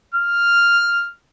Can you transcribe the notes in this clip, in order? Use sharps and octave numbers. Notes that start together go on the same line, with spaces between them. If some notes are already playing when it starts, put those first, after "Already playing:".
F6